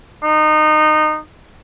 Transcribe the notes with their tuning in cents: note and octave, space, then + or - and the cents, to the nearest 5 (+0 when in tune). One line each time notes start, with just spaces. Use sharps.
D#4 -20